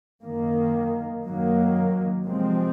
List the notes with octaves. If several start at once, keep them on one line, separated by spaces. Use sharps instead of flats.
F#2 D#3 A#3
F#2 D#3 F#3 A#3
C3 F3 G#3 C4